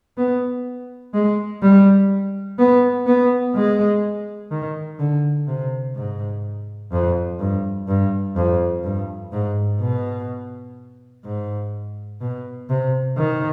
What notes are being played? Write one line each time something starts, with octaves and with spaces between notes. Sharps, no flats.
B3
G#3
G3
B3
B3
G#3
D#3
D3
C3
G#2
F2
G2
G2
F2
G2
G#2
B2
G#2
B2
C3
D#3